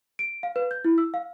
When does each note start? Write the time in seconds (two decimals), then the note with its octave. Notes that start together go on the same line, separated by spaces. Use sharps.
0.19 D7
0.43 F5
0.56 B4
0.71 G6
0.85 E4
0.98 E6
1.14 F5